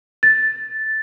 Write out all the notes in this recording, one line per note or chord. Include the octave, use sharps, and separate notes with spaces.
A6